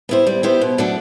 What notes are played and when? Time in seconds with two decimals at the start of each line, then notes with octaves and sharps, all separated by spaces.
0.09 B3 E4 G4 C5
0.27 G3
0.43 B3 E4 G4 C5
0.61 B2
0.78 F#3 A3 D4 F#4